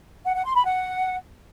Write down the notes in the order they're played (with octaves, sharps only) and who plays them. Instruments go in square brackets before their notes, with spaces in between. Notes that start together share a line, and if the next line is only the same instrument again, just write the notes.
[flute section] F#5
F#5
C6
B5
F#5